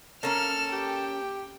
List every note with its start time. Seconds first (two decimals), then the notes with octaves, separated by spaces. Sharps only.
0.23 A#3 C#4 A4 A#5 F6 E7
0.72 G4 G5